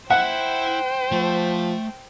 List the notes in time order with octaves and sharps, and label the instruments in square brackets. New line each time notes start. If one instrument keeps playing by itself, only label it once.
[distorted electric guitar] E4 E5 [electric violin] C5 G5 [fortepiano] F#5
[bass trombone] F3 [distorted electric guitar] A3